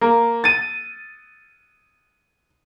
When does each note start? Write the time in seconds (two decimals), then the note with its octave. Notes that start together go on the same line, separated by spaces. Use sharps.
0.01 A#3
0.44 A6 D#7